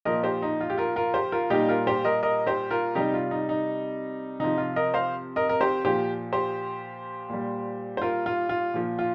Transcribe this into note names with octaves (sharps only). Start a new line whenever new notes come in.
A#2 F3 A#4 D#5
G4 C5
D#4
F4
G4
F4 A#4
F4 A#4
G4 C5
F4 A#4
A#2 G3 D#4 G4
F4 A#4
G4 C5
A#4 D#5
A#4 D#5
G4 C5
F4 A#4
C3 G3 D#4 G4
F4
D#4
D#4
C3 F3 D#4
F4
A#4 D#5
C5 F5
A#4 D#5
A#4
G4 C5
A#2 F3 G4 C5
G4 C5
A#2 G3
C5
F4 A#4
F4
F4
A#2 F3
F4